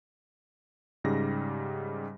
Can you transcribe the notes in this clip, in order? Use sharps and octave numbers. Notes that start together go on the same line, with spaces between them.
G#2 C#3 G3 A#6